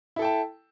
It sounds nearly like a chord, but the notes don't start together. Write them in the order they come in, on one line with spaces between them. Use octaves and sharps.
E4 A4 G5 A5